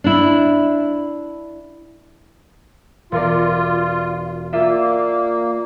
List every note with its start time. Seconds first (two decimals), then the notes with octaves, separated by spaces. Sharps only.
0.04 D4 E4
3.12 E1 F4 A#4 D5
4.53 A#3 F4 D5 E5